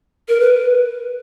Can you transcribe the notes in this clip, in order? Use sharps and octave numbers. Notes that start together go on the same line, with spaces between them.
A#4
B4